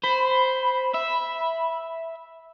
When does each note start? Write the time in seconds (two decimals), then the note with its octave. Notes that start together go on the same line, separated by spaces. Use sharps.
0.03 C5 B5
0.95 E5